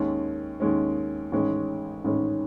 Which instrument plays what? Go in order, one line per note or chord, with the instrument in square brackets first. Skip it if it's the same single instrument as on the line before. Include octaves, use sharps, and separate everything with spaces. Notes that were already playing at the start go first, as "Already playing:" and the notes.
Already playing: [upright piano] D#2 D#3 G#3 C#4
D#2 D#3 G#3 C#4
A1 G#2 D#3 G#3 C#4
A1 G#2 D#3 G#3 C#4